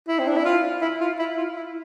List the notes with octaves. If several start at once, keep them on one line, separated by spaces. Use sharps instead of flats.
E4
C4
D4
E4
F4
E4
F4
E4
F4
E4